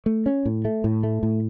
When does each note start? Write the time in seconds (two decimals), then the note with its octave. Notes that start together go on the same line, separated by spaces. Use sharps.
0.06 A3
0.26 C#4
0.45 A2
0.65 A3
0.84 A2
1.03 A3
1.23 A2